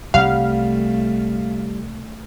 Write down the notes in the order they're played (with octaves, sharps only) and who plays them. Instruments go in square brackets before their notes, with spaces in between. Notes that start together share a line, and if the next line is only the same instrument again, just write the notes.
[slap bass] C2 [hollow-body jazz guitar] G3 F#5 [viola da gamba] A3 [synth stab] F5